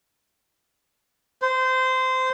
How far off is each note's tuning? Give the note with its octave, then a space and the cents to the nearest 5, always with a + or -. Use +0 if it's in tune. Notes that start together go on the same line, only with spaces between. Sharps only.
C5 -20